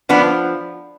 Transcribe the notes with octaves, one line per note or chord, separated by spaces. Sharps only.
F3 B3 D4